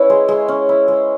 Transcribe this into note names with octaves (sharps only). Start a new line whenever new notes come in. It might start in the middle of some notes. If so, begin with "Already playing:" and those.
Already playing: C#4 E4 B4 C#5
G#3
G#3
C#4
E4
G#3